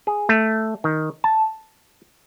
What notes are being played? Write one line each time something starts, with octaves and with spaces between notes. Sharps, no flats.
G#4
A3
D#3
A5